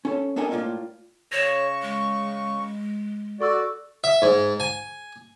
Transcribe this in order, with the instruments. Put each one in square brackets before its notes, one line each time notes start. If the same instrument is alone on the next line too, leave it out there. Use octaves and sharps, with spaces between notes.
[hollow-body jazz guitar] C#4 A4
B3 D4 A4 A#4 D#5 G#5
A2 A#3 D4 F4 D5
[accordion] C#3 C#6 [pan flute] C#5 [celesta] A#6 E7
[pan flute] G#3
[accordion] F#4 D5 [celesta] A4 C#6 E6
[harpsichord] E5
G#2
G#5